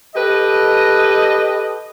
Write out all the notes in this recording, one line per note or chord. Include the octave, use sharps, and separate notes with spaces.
G4 A4 B4 D#5